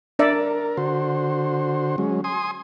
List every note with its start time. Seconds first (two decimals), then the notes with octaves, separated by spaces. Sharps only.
0.19 D4 A#4 D5 E5
0.77 D3 F#4 C5
1.98 F#3 G#3 C#4
2.24 G#5 C6 D#6